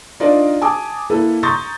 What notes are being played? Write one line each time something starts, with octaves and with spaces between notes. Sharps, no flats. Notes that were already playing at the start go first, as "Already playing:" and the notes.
D4 D#4 F4 A#4 D5 D#5
G#5 A5 D6 D#6
A#3 E4 A4 B4
A#5 C6 C#6 D#6 G6 A6